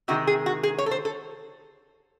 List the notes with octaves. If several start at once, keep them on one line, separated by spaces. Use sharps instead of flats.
C3 D#3 G#3 F#4
G#4
F#4
G#4
C#5
A4
C5
A4